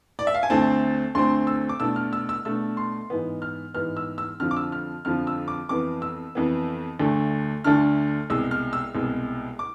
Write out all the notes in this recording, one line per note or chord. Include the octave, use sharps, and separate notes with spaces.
D5
E5
F5
G#5
D2 D3 A3 C4 A5
D2 D3 A3 C4 C6
E6
D6
B2 A3 D4 E6
F6
E6
E6
B2 A3 D4 E6
C6
G#2 E3 B3
F6
G#2 E3 B3 F6
E6
E6
F2 D3 F3 F6
D6
E6
F6
F2 D3 F3 F6
E6
D6
F2 E3 B3 D6
E6
F2 E3 B3
D2 D3 A3 D4
D2 D3 A3 D4 F6
C2 B2 G#3 E6
F6
E6
C2 B2 G#3
D6